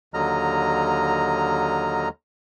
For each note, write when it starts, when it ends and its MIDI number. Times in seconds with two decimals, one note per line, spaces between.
0.14 2.09 39
0.14 2.09 50
0.14 2.09 54
0.14 2.09 75
0.14 2.09 82
0.14 2.09 89